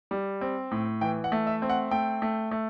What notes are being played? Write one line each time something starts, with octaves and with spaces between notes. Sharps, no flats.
G3
C4
A2
E3 G5
F#5
A3
E5
C4
F#5
A3 G5
A3
A3